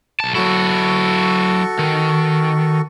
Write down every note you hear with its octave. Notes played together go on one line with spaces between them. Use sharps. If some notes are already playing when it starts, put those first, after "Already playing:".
B1 A5
F#3 E4 F#4 A4 C#6
D#3